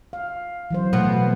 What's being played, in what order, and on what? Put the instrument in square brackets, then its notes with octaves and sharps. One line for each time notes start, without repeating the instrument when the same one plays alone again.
[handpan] F5
E3 F#3 C5
[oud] B2 B3 B4 [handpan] A3